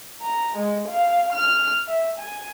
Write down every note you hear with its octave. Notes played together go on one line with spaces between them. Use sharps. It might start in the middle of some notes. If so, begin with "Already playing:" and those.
A#5
G#3
F5
F6
E5
G#5